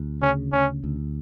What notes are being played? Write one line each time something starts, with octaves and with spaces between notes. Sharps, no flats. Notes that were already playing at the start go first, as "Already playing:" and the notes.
Already playing: D2
C#3 C#4
D2 C#4
D2